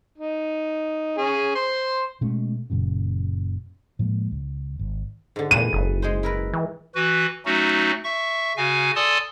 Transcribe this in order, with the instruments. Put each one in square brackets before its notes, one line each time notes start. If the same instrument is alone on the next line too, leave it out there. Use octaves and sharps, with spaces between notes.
[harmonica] D#4
C#4 G#4
C5 C6
[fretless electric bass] B2 G#3 A3 C#4
F#1 F#2 A#2 C#3
A2 F3 G#3 A#3
C#2
G#1
[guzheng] G#2 D3
[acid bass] A#2 [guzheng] E3 [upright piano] D#7
[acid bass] F#1
[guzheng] G#3 G#4 C5
E4 A#4 B4
[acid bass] E3
[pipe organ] E3 F#4 B4
F#3 A3 C#4 D#4 F#4
E5 C#6
C#3 F#4 F5 G#5
A4 D5 G#5 A5 C6 D#6